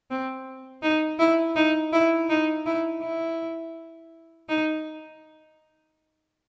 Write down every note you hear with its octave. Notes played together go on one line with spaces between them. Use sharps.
C4
D#4
E4
D#4
E4
D#4
E4
E4
D#4